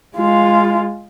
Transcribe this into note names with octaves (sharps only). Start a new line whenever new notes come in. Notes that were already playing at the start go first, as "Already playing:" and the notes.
G#3 F4